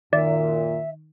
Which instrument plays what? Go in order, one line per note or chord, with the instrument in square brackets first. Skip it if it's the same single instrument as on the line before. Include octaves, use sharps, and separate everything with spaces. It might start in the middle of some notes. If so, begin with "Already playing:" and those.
[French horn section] F#2 A#2 [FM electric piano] D#3 [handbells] D5 [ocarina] E5